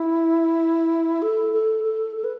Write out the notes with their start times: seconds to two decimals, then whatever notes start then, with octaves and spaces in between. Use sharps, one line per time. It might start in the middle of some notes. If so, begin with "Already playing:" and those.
Already playing: E4
1.22 A4
1.53 A4
1.84 A4
2.16 A4
2.24 B4